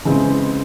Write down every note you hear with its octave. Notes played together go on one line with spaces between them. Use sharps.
C#3 E3 G#3 C4